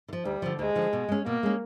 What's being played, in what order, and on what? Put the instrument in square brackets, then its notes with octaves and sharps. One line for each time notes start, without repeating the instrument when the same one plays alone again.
[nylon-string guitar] D3
F3
[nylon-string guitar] D2 [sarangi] G3
[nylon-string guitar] D3 F3
[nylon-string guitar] D2 [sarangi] G#3
[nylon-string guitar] D3 F3
B2
G#3 C#4
[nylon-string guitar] B2 [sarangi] A#3
[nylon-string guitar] G#3 C#4